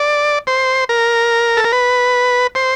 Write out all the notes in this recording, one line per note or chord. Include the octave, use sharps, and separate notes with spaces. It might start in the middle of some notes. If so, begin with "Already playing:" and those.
Already playing: D5
C5
A#4
A4
A#4
B4
C5